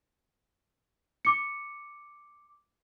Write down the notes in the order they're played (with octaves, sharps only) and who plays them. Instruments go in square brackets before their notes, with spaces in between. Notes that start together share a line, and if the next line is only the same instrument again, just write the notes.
[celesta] D6 C#7